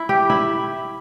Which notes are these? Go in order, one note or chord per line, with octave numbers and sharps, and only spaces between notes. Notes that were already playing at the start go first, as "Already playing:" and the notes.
Already playing: E4
G4
E4